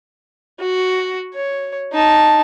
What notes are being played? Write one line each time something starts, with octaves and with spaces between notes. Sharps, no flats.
F#4
C#5
D#4 A5